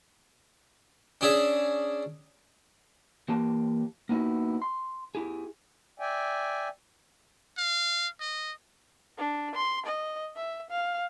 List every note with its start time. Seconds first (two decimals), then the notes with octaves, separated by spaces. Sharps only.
1.21 C#4 D4 G#4 E5
3.28 E3 A#3 G4 A5
4.09 A#3 B3 D#4 E4 F#4
4.62 C6
5.15 E4 G4 G#4
5.99 D5 E5 G5 G#5
7.58 F5
8.20 D#5
9.17 D4
9.55 C6
9.86 D#5
10.36 E5
10.70 F5